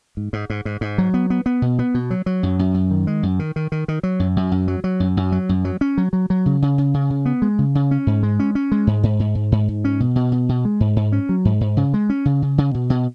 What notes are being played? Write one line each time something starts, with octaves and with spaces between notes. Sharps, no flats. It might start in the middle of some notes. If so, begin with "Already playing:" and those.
G#2
G#2
G#2
G#2
G#2
F#3
B3
B3
B3
B2
B3
B2
F#3
F#3
F#2
F#2
F#2
D#3
G#3
F#2
D#3
D#3
D#3
D#3
F#3
F#2
F#2
F#2
F#3
F#3
F#2
F#2
F#3
F#2
F#3
C#4
F#3
F#3
F#3
C#3
C#3
C#3
C#3
C#3
B3
G#3
C#3
C#3
C#4
G#2
G#3
C#4
C#4
G#3
G#2
G#2
G#2
G#2
G#2
G#2
C#4
B2
B2
B2
B2
G#3
G#2
G#2
C#4
F#3
G#2
G#2
C#3
G#3
C#4
C#3
C#3
C#3
B2
B2